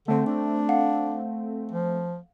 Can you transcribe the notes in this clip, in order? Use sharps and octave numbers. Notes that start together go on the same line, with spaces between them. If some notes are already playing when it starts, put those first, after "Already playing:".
D3 A3 C4
D4
F5 F#5
F3